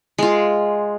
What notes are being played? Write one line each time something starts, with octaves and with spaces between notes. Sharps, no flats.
G#3 F4